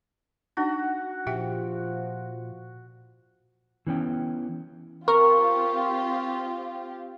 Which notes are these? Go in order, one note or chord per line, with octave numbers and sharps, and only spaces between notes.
D4 D#4 F#4
A#2 F3 G4 E5 G5
E3 B3 C#4 G5
C4 F4 G4 A#4 C#6